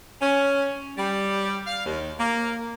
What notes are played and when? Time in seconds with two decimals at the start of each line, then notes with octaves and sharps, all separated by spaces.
0.21 C#4
0.97 G3
1.67 F5
1.86 D#2
2.19 A#3